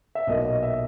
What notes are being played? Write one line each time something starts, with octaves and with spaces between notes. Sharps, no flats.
E5
B1 A#2 A#3 D#5
D#5
E5